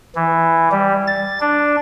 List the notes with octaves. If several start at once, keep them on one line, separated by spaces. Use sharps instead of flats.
E3
G3
A6
D4